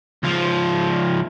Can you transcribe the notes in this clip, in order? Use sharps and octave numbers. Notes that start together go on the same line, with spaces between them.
C#2 F3